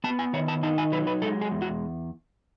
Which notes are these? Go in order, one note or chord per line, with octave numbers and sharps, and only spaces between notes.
B3 A5
G#5
D#3 C#5
A5
D#4 A5
G#5
F#3 B4
B4
G#3 A4
G#4
E2
F#4